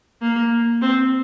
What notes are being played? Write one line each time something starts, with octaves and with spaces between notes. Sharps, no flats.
A#3
C4